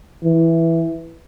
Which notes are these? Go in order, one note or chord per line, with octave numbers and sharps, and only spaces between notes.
E3